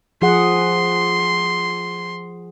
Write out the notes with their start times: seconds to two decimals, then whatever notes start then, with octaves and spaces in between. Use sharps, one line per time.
0.22 F3 G#4 F#5 C6